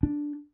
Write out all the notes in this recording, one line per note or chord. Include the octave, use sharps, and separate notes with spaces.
D4